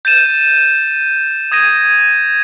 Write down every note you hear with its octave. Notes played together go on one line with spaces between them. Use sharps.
G6 A6 D#7 E7
D#6 G#6 A#6 D#7